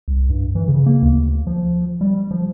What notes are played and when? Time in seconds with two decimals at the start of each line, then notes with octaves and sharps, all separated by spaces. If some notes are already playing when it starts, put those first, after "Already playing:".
0.08 C2
0.29 G2
0.55 E3
0.68 C#3
0.86 A#3
1.02 D2
1.47 F3
2.01 G3
2.31 F3